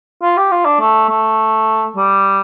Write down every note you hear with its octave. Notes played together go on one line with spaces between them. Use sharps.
F4
G4
F4
D4
A3
A3
G3